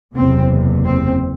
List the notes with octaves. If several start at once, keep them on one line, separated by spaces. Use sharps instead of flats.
F#1 E2 C3 C4
C4